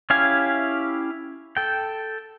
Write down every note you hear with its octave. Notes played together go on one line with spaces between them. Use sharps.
C#4 E4 G4 F5 G#5
A4 G5